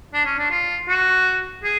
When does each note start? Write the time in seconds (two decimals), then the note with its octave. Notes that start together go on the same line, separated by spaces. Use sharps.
0.14 D4
0.25 C#4
0.38 D4
0.51 F4
0.89 F#4
1.63 G#4